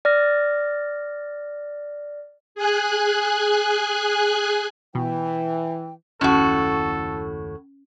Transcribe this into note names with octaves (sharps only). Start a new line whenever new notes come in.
D5 F6 A#6
G#4 G#5 F#6
B2 E3 G5
F#1 D#2 A2 C#4 F#4 A4 A5